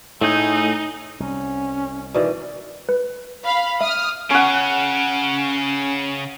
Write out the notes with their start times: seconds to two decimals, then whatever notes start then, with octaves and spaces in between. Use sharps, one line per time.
0.21 A2 A3 D#4 G#4 G6
1.20 C2 C#4
2.14 B2 D#3 E3 D5
2.89 B4
3.44 F5 B5
3.81 E5 D#6 F6
4.31 C#3 C#4 F#5